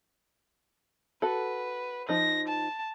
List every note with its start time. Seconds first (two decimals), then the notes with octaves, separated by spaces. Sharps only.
1.22 F#4 A4 B4
2.09 F3 D#4 A#6
2.48 A5